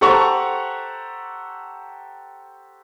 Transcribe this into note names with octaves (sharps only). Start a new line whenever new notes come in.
G4 A4 C5 F#5 A#5 C#6